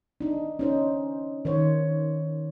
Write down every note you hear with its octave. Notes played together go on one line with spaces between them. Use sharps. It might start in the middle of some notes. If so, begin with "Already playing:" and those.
D4 D#4
C#4 D#4 C5
D#3 C5 C#5